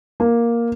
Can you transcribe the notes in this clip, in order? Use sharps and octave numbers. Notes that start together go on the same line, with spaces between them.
A#3